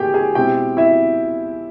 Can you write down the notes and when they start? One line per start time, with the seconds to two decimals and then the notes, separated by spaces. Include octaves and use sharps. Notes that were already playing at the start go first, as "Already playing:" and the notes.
Already playing: A2 F#3 A#3 G4 G#4 G5 G#5
0.14 G#4 G#5
0.35 B2 G#3 C4 E4 G4 G5
0.77 E4 E5